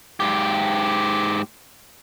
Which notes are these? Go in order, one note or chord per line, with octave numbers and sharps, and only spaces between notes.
G#2 G4